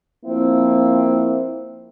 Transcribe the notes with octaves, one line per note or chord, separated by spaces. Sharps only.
F3 A#3 C4 E4